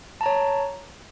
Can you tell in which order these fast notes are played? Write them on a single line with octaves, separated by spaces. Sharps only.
A5 A#5 C#5